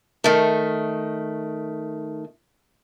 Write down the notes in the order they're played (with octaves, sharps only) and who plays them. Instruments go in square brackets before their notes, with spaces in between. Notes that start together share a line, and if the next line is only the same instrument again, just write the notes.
[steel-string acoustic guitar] D#3 A3